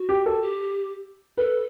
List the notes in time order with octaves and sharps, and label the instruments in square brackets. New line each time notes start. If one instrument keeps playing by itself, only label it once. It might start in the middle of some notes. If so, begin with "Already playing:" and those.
Already playing: [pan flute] F#4
[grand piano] G4
A4
[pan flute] G4
[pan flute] A4 [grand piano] B4